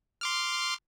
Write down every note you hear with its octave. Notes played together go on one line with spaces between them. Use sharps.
C6 D6 F6